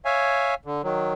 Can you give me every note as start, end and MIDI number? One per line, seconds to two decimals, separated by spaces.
0.05 0.54 73
0.05 0.54 76
0.05 0.54 77
0.05 0.54 80
0.65 0.82 50
0.84 1.14 51
0.84 1.14 54